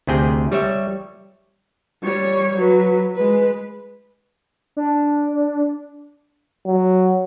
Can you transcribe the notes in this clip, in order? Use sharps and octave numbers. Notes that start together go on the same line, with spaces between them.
D2 C3 G#4 G5
G3 C#5 E5
G3 C#5
F#3 B4
G#3 B4
D4
F#3